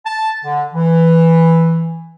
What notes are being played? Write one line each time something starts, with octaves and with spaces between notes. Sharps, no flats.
A5
D3
E3